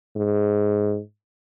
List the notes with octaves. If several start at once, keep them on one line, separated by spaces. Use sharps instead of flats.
G#2